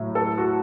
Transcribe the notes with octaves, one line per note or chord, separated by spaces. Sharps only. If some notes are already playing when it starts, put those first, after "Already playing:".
Already playing: A2 F#3 A3
A4
F#4